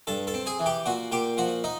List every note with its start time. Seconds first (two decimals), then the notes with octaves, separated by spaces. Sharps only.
0.07 G2 A4 A5
0.27 A4 A5
0.34 C4
0.46 G#4 G#5
0.60 E3
0.66 G4 G5
0.86 A#2 F#4 F#5
1.12 A#2 G4 G5
1.37 F3 F#4 F#5
1.64 D#4 D#5